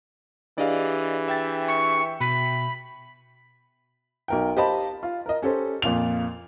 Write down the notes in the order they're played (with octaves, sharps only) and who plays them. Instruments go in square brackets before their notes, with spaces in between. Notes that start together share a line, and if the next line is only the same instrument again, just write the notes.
[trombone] E3 [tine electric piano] D4 G4 G#4 [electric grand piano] D5 D#5 F5
[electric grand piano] E5 G5 A6
[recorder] C#6
[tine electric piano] B2 [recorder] B5
[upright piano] B1 A#4 G5
G4 C5 D#5 F5 A5 B5
F4
A#4 D#5
C#4 G4 A4 C5
F2 A#2 F4 F7